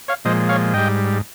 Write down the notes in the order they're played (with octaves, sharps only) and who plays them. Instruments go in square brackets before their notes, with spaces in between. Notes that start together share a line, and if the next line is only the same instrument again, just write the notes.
[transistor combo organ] C#5 F5
A#2 F3 G#3 C5 D#5
C#5 F5
G#2 G3 D#5 G5